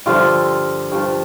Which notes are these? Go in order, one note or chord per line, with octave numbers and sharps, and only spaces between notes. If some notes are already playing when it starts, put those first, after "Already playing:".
G2 D3 F3 F4
G2 F3